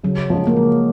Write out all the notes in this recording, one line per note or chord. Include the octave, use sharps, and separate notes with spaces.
C#3 F#3
F3 G#3 C#4
A#3
C#3 G#3